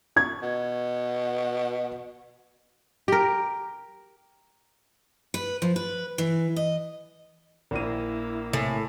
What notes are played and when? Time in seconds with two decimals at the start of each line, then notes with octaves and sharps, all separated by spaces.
0.16 C#6 G#6
0.42 B2
3.08 G4 A#4
5.34 B4
5.62 F3
5.76 B4
6.18 E3
6.56 D#5
7.71 A#1 A#3 E4 D#7
8.53 A2 C3 G#5